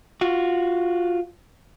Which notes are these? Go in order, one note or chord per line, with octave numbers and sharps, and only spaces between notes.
F4 F#4